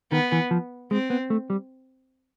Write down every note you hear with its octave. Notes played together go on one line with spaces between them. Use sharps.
D#3 B3
E3
F3
G#3 C4
B3
A3
G3